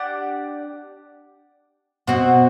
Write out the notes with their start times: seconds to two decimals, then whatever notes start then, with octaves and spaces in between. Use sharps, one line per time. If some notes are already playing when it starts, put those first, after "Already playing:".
Already playing: D4 G4 D5 F#5
2.07 B2 C4 F#4 C5 F#5